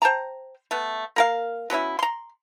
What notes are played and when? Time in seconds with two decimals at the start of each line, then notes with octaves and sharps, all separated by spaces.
0.02 C5 G5 A5 A#5
0.71 A3 B3
1.16 A#3 A#4 F5
1.70 F#3 B3 C#4 E4
1.99 A#5 C6